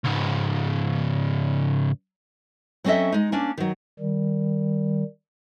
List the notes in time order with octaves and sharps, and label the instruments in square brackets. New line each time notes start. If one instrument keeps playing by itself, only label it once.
[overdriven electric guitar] C#2 G#2
[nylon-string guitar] F#3 C4 C#4 A4 D#5 E5
G#3 D#4
A#3 C#4 D4
D#3 F#3
[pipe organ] D#3 G3